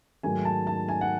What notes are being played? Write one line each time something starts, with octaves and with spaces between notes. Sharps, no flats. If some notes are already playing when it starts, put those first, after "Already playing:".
G#2 D#3 F#3 A3 G#5
A5
A5
G#5
F#5